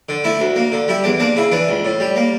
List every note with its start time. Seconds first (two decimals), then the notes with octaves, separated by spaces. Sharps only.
0.09 D3
0.24 A3 E4
0.40 D2
0.56 A#3
0.72 D3
0.88 G3 E4
1.04 E2 D4
1.20 A#3 D4
1.36 C#3 E4
1.52 E3 D4
1.69 C#2
1.85 A2
2.00 G3
2.16 A#3